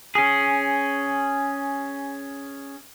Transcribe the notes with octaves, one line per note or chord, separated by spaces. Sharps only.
C#4 G#4